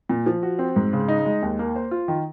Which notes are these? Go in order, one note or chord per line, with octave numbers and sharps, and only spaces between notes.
A#2
F3
F#4
C4
G#2
C#3
D#4
G#3
D#2
A#3
C5
F4
D#3